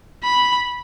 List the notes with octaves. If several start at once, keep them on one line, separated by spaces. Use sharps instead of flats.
B5